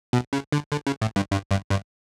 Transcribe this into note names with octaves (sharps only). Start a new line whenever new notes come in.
B2
C#3
D3
D3
C#3
A2
G2
G2
G2
G2